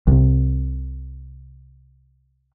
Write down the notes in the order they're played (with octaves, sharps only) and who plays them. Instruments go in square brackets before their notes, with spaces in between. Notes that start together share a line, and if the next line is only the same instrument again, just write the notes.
[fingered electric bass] C2 C3